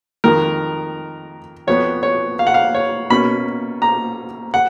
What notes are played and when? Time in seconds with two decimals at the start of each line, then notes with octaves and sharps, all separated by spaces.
0.24 F2 D#3 G#3 A#4
1.67 F2 F3 B3 C#5
2.03 C#5
2.39 F5
2.47 F#5
2.54 F5
2.74 C#5
3.10 B2 A#3 C#4 B5
3.82 A#5
4.54 F#5